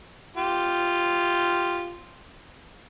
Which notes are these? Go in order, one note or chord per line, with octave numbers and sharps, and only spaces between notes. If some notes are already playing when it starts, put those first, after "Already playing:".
F4 G4